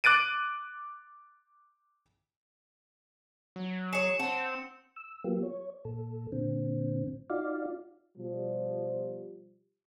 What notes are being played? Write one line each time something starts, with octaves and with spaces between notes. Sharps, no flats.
D6 F#6 A6 D7 D#7
F#3
G#4 C#5 C#7 E7
C4 F#5 A5
E6
F#3 A#3 B3 F4 G4
C#5
A#2 A4
A#2 D3 C4
D#4 F4 F#4 D5 F5
B2 F3 G3